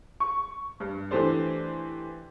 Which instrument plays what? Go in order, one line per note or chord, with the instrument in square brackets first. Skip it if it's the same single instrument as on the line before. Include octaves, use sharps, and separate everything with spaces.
[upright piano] C#6
G2
E3 A3 D4 G4 C5 D5